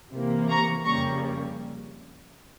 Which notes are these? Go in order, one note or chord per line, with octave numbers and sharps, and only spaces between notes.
C3 E3 A#3
A#5 C#6
F2 C#3 G3 A#3 A#5 C#6